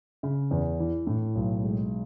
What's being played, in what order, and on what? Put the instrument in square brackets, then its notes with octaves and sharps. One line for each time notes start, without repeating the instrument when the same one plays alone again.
[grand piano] C#3
E2
E3
A2
B1
G#3